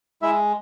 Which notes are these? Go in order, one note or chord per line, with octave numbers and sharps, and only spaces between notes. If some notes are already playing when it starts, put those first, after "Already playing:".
G#3 E4 E5